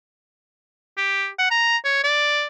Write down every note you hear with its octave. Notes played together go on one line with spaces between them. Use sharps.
G4
F#5
A#5
C#5
D5